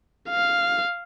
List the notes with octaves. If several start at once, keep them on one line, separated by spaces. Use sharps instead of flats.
F5